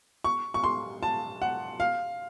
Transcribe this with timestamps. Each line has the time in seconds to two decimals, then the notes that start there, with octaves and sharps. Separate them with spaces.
0.24 C#6
0.54 C#6
0.64 C6
1.03 A5
1.42 F#5
1.80 F5